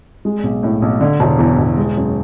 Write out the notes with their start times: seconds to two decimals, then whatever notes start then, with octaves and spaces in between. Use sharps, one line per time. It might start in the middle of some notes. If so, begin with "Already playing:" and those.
0.25 G#3
0.43 B1
0.63 A2
0.82 B1
1.01 D3
1.20 E1
1.39 E2
1.59 E1
1.77 G#3
1.97 F#2